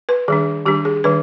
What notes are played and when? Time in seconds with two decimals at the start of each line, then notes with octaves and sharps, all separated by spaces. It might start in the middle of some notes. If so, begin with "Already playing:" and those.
0.09 B4
0.28 D#3 G3 D4 G#4
0.66 D#3 G3 D4 G4
0.85 G#4
1.04 D#3 G3 D4 B4